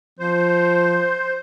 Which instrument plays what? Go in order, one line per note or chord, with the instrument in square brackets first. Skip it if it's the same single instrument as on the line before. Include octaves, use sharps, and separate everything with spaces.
[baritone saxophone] F3 [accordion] C5